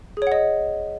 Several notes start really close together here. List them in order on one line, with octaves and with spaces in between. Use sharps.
G#4 C#5 F#5 D#5